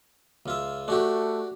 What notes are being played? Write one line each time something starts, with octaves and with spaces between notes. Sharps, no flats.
C#2 F4 E5
A3 D4 F#4 G4